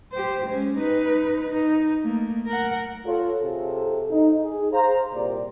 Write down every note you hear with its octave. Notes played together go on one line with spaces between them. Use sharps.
G4 C5
G#3 C#4
D#4 B4
D#4
A3 A#3
A#4 F#5
F4 A4 C#5
C3 F4 G#4 A4
D#4
G#4
C5 F5 A#5
C2 A#2 G4 D5